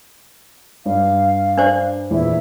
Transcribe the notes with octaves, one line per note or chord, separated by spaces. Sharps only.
G2 F5
D4 C5 D5
E2 A#2 E4